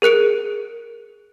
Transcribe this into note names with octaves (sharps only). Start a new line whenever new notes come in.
G#4 A#4 F#6 C#7 D7